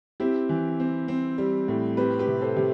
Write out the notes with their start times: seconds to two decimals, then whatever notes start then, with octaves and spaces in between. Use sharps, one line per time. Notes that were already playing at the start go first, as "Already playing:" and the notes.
0.20 C4 E4 G4
0.49 E3
0.80 C4
1.08 C4
1.38 G3
1.68 A2
1.97 C4 G4 B4
2.19 G4 B4
2.27 C3
2.41 A4 C5
2.56 C3